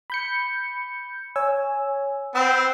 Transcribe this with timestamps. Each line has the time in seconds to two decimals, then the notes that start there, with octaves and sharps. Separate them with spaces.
0.10 B5 G6 C#7
1.36 C#5 G#5 E6
2.35 C4 F#5 B5 E6